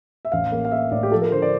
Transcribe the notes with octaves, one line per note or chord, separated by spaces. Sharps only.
E5
A1 F5
A#3
F5
A#3 E5
A2 D5
G4
F3 A4
A#4
D3 C5
D5